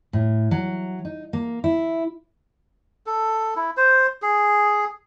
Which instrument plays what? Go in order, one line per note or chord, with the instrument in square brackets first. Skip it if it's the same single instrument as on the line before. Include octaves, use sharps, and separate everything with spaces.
[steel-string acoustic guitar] A2
F#3
D#4
A#3
E4
[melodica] A4
E4
C5
G#4